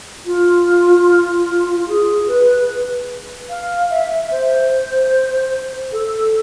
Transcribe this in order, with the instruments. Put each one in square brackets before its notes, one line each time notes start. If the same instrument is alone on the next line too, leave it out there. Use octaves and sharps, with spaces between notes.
[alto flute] F4
F4
G#4
B4
F5
E5
C5
A4